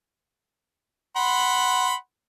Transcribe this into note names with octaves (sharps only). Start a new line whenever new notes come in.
F#5 B5 C6